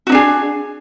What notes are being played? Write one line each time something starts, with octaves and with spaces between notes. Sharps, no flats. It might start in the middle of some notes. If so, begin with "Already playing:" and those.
D4 D#4 F#4 G#4